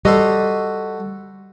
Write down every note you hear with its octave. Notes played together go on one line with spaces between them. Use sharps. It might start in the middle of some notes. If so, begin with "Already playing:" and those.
G3 F#4 A4 C5 D#5